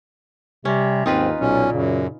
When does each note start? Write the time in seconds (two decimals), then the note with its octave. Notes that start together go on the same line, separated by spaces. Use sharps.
0.65 C3 G3 C#4
1.06 D#2 G#2 C4 D#4 F4 B4
1.40 B1 A#2 C#4
1.73 F#2 C#3